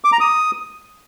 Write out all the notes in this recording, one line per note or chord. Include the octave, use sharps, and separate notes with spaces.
D6
A#5
D#6